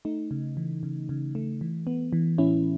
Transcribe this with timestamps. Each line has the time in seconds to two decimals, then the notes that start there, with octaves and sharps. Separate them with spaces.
0.05 A3 D#4
0.31 C#3
0.57 E3
0.83 C#3
1.09 C#3
1.35 A3
1.61 E3
1.87 B3
2.13 E3
2.38 A2 C#4 E4